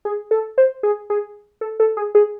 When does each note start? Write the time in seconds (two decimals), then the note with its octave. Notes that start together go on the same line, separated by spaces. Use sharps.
0.05 G#4
0.31 A4
0.58 C5
0.83 G#4
1.10 G#4
1.61 A4
1.80 A4
1.97 G#4
2.15 G#4